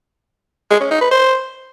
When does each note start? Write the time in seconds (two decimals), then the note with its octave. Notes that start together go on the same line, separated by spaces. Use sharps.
0.70 G#3
0.81 C#4
0.91 D#4
1.01 B4
1.11 C5